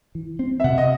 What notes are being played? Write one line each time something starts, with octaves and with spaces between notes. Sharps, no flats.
E3
C4
E5
C3 F#5
D#5